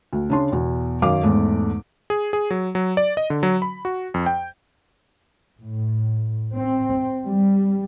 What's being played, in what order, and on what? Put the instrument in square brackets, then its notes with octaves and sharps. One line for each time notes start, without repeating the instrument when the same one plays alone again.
[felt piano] D2
C#3 D4 C6
E2 B2
F#2 D#3 D#4 F5 D6
E2 G#2 A3
[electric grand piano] G#4
G#4
F#3
F#3
D5
D#5
D3
F#3
B5
F#4
F2
G5
[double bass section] A2
C4
G3